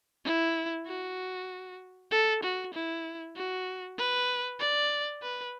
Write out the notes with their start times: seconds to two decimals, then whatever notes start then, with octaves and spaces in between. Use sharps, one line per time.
0.25 E4
0.87 F#4
2.11 A4
2.43 F#4
2.74 E4
3.36 F#4
3.98 B4
4.60 D5
5.22 B4